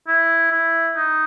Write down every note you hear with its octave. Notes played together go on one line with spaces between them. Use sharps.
E4
E4
D#4